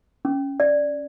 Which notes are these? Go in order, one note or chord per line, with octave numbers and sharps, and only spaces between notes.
C#4
D5